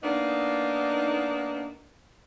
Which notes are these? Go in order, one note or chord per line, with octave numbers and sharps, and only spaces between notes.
A#3 B3 D4 D#4